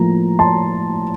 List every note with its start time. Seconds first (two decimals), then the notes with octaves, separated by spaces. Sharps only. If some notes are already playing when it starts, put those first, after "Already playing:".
Already playing: A2 F3 A#3 A#5
0.39 A5 C6